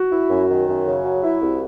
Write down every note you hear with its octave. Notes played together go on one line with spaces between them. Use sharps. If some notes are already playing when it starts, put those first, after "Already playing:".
Already playing: F#4
E4
F#2
D#3
F#2
C#3
F#3
E4
C2